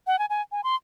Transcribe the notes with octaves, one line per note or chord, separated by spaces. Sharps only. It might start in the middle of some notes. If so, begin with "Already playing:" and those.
F#5
G#5
G#5
G#5
C6